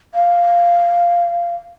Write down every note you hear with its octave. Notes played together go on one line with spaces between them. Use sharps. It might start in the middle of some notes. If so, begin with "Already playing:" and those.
F5